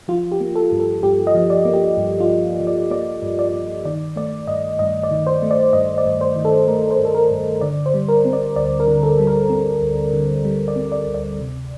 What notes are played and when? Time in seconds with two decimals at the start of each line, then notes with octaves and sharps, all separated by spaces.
0.08 F3 F4
0.32 G4
0.41 A#3
0.55 A4
0.72 G2
0.80 A4
1.03 G2 G4
1.27 D#5
1.35 F3
1.50 D5
1.65 A#3
1.74 G4
1.97 G2
2.20 F4
2.29 G2
2.60 F3
2.67 D5
2.90 A#3 D5
3.22 G2
3.39 D5
3.54 G2
3.85 D#3 D5
4.16 A3 D5
4.47 G2 D#5
4.79 G2 D#5
5.03 D5
5.11 D#3
5.26 C5
5.42 A3
5.51 D5
5.73 G2 D#5
5.98 D5
6.06 G2
6.21 C5
6.36 D#3
6.45 A4
6.67 A3 A#4
6.91 C5
6.99 G2
7.05 A4
7.15 A#4
7.31 G2
7.61 D3 D5
7.86 C5
7.94 G3
8.08 A#4
8.25 C4
8.33 D5
8.56 D2 D5
8.80 A#4
8.87 D3
9.03 A4
9.19 G3
9.27 A#4
9.50 C4
9.82 D2
10.13 D3
10.45 G3
10.68 D5
10.76 C4
10.92 D5
11.07 D2
11.14 D5
11.39 C3